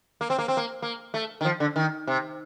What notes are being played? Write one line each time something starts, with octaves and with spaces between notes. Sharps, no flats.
A#3
C4
A#3
C4
A#3
A#3
A3
D#3
F3
D3
D#3
C3